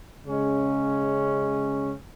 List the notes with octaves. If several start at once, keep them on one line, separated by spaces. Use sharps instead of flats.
C#3 G#3 C#4